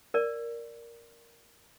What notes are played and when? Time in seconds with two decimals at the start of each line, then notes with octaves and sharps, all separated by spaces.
0.14 A#4 D5